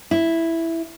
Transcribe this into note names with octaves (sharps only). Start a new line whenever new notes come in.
E4